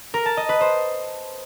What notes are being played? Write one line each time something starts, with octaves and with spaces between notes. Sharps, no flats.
A#4
A5
D#5
B4
C5